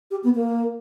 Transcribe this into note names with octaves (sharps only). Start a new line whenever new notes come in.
G4
B3
A#3